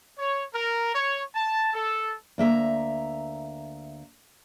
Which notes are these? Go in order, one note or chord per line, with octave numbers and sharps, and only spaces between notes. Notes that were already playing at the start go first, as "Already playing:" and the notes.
C#5
A#4
C#5
A5
A4
D2 A#3 E5 A#5